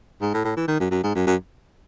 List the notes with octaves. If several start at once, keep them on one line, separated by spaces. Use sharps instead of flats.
G#2
A2
A2
E3
D#3
F#2
F#2
G#2
F#2
F#2